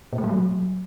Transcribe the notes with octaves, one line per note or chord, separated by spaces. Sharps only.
A#2
A3
G3
F#3